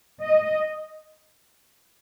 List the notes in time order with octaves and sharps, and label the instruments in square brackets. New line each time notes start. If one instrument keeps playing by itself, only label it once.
[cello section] D#5